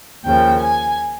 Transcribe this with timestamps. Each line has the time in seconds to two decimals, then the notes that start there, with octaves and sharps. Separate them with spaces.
0.25 D#2 C#3 F3 G5
0.60 G#5